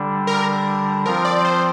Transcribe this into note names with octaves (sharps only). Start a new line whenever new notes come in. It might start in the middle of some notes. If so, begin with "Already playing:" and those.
Already playing: D3 G3 D4
A#4
F3 C4 F4 A#4
D5
C5